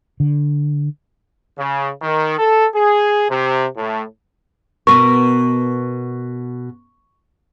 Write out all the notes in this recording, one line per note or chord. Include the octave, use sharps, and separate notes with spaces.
D3
C#3
D#3
A4
G#4
C3
A2
B2 A#4 C#6